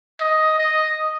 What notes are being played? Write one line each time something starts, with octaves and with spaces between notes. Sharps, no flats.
D#5
D#5